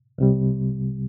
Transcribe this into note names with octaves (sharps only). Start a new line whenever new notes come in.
C2 C3 G3